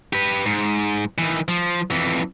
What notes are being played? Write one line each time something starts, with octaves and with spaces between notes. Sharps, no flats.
G4 B4
G#2
D#3 E3
F3
F2 E3